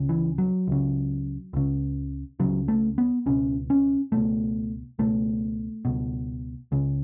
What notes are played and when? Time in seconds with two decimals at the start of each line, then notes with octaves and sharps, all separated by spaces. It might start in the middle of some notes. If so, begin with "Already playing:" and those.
Already playing: C#2 C#3
0.09 E3
0.38 F#3
0.68 C#2 C#3
1.53 C#2 C#3
2.40 C#2 C#3 F#3
2.68 A3
2.98 B3
3.26 C#2 B2 C#4
3.70 C#4
4.12 C#2 B2 A3
4.99 C#2 B2 A3
5.85 C#2 B2
6.72 C#2 C#3